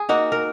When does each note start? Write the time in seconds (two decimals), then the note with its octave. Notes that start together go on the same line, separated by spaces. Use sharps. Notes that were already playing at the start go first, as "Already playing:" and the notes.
Already playing: G#4
0.09 A#3 D#4 F#4
0.32 A#4